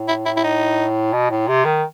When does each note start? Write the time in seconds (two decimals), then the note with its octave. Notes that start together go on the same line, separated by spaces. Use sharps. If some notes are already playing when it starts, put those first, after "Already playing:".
Already playing: A2
0.08 E4
0.26 E4
0.37 E4
0.44 D#4
1.13 B2
1.30 A2
1.48 C3
1.65 D#3